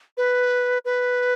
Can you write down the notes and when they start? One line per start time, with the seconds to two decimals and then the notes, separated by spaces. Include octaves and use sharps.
0.17 B4
0.85 B4